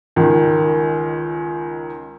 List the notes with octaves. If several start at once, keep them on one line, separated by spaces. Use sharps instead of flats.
C#2 D#3